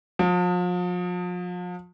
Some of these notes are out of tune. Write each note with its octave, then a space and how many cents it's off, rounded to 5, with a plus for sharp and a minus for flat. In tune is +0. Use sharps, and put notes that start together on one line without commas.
F3 +40